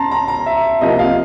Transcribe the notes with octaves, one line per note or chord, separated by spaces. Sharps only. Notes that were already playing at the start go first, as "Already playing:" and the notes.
Already playing: C#4 A5 A#5 C6
A#5
A#5
E5
C3 F3 A#3 D#5
F5